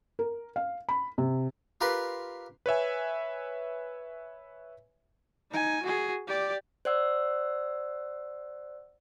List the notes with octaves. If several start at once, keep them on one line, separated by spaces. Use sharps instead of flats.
A#4
F5
B5
C3
F4 G4 A#4 B4 C6
B4 C#5 E5 G#5
D#4 G#5
F#4 G#4
G4 D5
C5 D5 F#5 E6